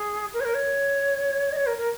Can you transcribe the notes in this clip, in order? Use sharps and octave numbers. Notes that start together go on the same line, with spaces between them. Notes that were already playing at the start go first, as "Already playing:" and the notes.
Already playing: G#4
A#4
C#5
A#4
C#5
D#5
C#5
A#4
A#4